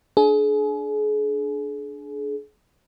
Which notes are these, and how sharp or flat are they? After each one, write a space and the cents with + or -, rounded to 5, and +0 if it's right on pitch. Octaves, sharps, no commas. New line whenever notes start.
D4 +0 G#4 +35